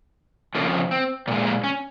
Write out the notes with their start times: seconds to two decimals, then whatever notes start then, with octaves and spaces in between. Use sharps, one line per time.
0.55 F2 C#3 F3 A#3
0.91 C4
1.28 A#2 A#3
1.31 G#3
1.46 A#3
1.64 C#4